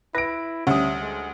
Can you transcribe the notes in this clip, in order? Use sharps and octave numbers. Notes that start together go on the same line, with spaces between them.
E4 B4 A#6 D7
D2 G3 C#4 E5 F#5 D#6
G#3